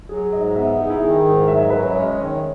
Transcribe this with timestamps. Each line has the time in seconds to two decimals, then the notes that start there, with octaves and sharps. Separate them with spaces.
0.09 F#3 G#4
0.32 G#2 D#5
0.55 B3 E5
0.67 E5
0.79 D#4 G#4
0.90 E4
1.01 D#3 G#4
1.24 G#2 A#4
1.48 F#3 E5
1.60 D#5
1.70 C#4 B4
1.82 C#5
1.94 G#3 D#5
2.07 D#5
2.17 D#3 C#5
2.29 C#5